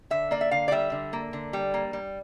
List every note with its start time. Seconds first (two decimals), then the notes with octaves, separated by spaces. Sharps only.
0.10 D3 E5
0.31 A#3 D5
0.41 E5
0.51 D3 F5
0.68 D5
0.71 G3 E5
0.92 D3
1.13 A#3
1.33 D3
1.53 G3
1.74 A#3
1.93 G3